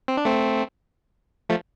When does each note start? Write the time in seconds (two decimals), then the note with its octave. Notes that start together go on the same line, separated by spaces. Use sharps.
0.08 C4
0.17 D4
0.25 A3 C4
1.49 F3 A3